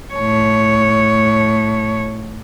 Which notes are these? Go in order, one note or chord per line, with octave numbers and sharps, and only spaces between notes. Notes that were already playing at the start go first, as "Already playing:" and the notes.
A2 C#5